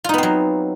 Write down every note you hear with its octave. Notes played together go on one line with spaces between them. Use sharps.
F#3 B3 C4 D#4 F4